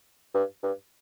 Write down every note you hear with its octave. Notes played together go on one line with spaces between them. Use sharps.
G2
G2